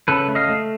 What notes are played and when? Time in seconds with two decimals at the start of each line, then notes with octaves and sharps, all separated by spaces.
0.08 C#3 A4 B4
0.28 A3
0.35 D#5 F5
0.49 A3